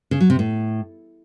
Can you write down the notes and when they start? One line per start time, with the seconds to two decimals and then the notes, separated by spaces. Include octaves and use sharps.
0.11 C#3
0.20 F#3
0.30 C3
0.39 A2